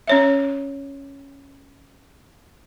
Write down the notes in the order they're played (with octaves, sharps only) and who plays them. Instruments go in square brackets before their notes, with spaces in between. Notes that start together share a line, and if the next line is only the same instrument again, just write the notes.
[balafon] C#4 C#5 E5